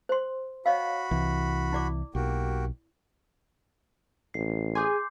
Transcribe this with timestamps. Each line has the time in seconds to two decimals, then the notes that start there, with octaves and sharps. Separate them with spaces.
0.09 C5 C6
0.66 F#4 C#5 D#5 F5 B5
1.11 C2 E3
1.73 E4 D5 D6
2.15 B1 A#3 F#4 G4
4.34 A1 C7
4.75 G#4 G#5 C6 D6 G6